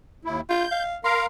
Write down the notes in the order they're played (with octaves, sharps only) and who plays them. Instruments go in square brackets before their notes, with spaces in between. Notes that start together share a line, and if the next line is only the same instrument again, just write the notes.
[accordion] D#2 E4
[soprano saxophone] F4 [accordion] G6
[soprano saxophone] F5
[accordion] A#4 F5 A#5 [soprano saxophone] C6